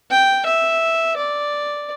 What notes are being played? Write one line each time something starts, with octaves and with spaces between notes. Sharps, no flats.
G5
E5
D5